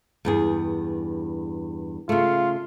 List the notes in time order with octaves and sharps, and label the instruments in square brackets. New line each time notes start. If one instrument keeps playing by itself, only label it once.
[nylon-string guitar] E2 G2 G#4
[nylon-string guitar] C#3 A3 [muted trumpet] F4